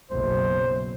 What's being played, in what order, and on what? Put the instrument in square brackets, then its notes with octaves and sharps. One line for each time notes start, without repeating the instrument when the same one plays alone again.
[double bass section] F#1 B1 F#3 [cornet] C5